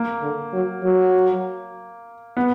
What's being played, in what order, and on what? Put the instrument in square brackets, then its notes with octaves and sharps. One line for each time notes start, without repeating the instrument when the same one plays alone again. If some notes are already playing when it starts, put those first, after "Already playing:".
Already playing: [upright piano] A#3
[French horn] D3
F#3
F#3
[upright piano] B3